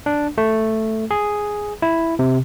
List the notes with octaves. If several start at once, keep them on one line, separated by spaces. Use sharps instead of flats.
D4
A3
G#4
E4
C3